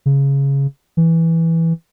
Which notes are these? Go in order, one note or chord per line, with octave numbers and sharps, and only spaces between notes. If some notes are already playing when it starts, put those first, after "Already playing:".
C#3
E3